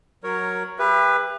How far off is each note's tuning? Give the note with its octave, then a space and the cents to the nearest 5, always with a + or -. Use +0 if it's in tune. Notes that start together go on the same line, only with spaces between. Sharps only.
F#3 +0 A#4 +0 C#5 +0
G4 +35 B4 +0 E5 +30